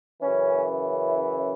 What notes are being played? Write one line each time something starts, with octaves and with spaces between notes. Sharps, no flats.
F#2 C#3 E3 C#4
E4